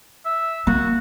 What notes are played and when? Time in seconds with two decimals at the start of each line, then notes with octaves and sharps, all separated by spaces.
0.25 E5
0.67 A#3 F#4